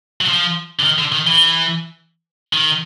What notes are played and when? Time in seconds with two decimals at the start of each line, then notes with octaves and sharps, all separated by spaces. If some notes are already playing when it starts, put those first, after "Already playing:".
0.21 F#3
0.28 F3
0.80 D3
0.84 D#3
0.98 D3
1.12 D#3
1.27 E3
2.53 D#3